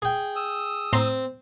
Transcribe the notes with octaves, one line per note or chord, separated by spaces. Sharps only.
G#4 G5
D#6 E6
A2 C4 A#5 C6